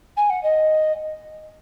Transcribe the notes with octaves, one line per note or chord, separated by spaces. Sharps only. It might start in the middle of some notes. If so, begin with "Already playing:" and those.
G#5
F#5
D#5